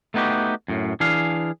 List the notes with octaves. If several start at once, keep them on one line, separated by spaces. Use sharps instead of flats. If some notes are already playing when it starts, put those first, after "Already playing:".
A3 B3 D#4 F#4 G4
F#2 A2
E3 D4 G#4 F5